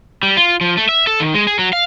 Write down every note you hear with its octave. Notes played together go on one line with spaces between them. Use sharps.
G3
F4
F3
A3
E5
A4
D#3
G#3
G#4
F#3
F5